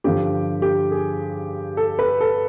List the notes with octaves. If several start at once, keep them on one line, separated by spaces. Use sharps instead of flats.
G2 D3 F3 G4
G4
G#4
A4
B4
A4